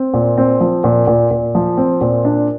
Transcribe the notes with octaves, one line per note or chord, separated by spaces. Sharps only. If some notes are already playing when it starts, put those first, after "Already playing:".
Already playing: C4
A#2
C4
F3
A#2
A#2
A#2
F3
C4
A#2
D4